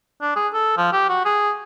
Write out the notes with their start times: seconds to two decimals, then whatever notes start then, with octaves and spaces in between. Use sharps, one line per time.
0.21 D4
0.36 G#4
0.54 A4
0.77 F3
0.92 G4
1.09 F#4
1.25 G#4